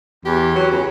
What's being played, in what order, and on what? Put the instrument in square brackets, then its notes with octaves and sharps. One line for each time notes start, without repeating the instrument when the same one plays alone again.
[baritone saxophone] E2 [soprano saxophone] G4
[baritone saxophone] F#3
[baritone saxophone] C#2 [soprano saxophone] C#4